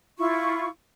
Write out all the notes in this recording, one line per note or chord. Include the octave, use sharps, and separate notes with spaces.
E4 F4 C#6